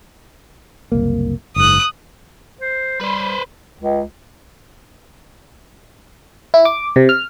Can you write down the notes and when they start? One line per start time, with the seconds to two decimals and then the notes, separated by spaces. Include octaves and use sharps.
0.92 F#1 C2 A#3
1.56 F#1 G#2 D#6 F#6
2.61 C5
3.01 G3 B4 C5
3.81 C#2
6.54 E4
6.65 D6
6.96 C3
7.09 F6